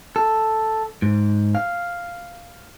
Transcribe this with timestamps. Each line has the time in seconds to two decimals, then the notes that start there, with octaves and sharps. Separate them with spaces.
0.16 A4
1.02 G#2
1.55 F5